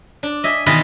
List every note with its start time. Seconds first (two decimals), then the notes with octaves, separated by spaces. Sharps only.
0.23 D4
0.43 D#5 E5 G#5
0.66 B2 D#3 E3 F4 B4 D#5